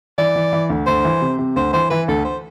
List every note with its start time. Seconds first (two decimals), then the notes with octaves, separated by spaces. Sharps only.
0.18 E3 D5
0.36 E3
0.53 E3
0.70 D2
0.87 D2 C5
1.05 E3
1.22 C3
1.39 C3
1.56 D2 C5
1.73 E3 C5
1.90 E3 B4
2.08 D2 A4
2.25 C5